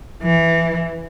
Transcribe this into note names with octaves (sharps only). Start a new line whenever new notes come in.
E3